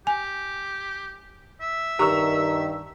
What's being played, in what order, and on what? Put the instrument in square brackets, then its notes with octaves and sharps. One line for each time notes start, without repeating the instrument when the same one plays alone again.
[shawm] G4 [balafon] G#5
[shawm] E5
[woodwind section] G2 D#3 [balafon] G4 [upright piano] A#5 C#6 E6